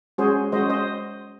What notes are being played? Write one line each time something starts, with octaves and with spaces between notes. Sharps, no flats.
G#3 C#4 F#4 G#4 C5
G#3 C#4 F#4 C5 D#5
C5 D#5